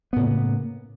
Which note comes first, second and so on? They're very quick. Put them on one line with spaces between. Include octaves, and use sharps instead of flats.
B3 A2 C#3 A#3